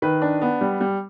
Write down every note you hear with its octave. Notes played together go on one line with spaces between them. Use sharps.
D#3 B4
D4
B3
G3
G3